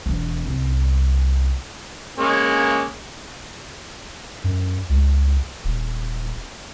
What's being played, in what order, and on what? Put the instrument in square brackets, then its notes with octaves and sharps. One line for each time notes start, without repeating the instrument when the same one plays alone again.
[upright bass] E1 E2
C2
[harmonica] G#3 A#3 C#4
[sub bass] F#2
C#2
D#1